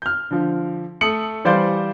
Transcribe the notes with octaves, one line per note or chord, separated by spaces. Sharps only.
F6 G6
D3 F3
A3 D#6 C#7 F#7
E3 G3 C5 D5 F5 G6